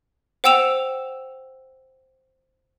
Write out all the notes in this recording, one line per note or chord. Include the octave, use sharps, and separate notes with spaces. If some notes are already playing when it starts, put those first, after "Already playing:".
C5 F#5 G5 E6 E7 F7